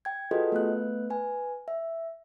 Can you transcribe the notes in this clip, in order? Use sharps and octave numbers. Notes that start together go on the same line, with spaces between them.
G5 G#6
F4 F#4 G#4 A4 B4 D#5
A3 B3 B4 F#6
B4 G#5
E5